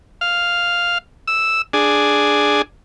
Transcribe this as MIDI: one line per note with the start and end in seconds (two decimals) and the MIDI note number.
0.21 0.98 77
1.27 1.62 88
1.73 2.62 62
1.73 2.62 68